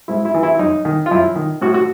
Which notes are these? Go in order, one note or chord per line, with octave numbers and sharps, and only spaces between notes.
G#2 E4
E4
E3
E4
F#2 D#4
D#3
F4
F#2 E4
D#3
A2 F#4
F#4